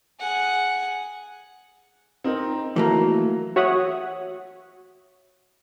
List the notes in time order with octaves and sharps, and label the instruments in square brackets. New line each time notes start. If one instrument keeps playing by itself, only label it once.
[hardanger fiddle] G#4 F#5
[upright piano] C4 D#4 A#4
[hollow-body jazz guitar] E3 A3 A#3 [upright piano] F#3
[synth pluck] F#4 C#5 E5 F#5 D#6